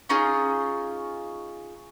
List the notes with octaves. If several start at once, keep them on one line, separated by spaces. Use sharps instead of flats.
C#4 D#4 F4 G#4